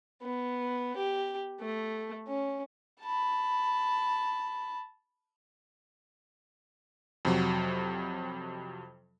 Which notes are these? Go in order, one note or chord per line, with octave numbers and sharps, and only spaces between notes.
B3
G4
A3
C#4
A5 B5
F2 C3 F#3